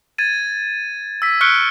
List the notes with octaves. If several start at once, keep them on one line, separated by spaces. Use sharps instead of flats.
G#6 A6 D#7
E6 B6
C#6 F6 F#6 C#7 D7 G7